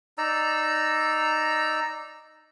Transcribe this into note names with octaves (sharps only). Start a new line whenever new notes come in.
D#4 D5 A#5 E6